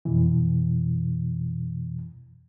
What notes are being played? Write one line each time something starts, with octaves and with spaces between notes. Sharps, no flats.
F2 B2 E3